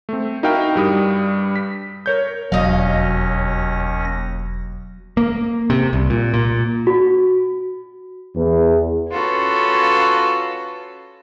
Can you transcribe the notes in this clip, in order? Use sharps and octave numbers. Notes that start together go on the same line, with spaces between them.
A3 C4
D#4 E4 F#4 A#4 F5 G5
G2 G3 D#6
B6
A#4 C#5 G6
E1 D#2 F#3 C#4 D#5 F5 A#6
A#3
C3
C2
A#2
A#2
F#4
E2
C#4 F4 F#4 A4 B4